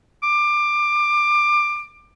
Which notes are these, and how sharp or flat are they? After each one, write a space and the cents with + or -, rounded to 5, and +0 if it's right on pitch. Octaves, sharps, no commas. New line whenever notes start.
D6 +20